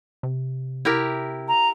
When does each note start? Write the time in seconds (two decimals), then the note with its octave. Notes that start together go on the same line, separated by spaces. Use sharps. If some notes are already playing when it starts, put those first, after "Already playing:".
0.23 C3
0.85 E4 G4 A#4
1.48 A#5